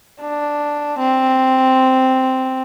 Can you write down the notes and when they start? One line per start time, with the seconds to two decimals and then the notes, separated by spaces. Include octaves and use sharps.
0.21 D4
0.99 C4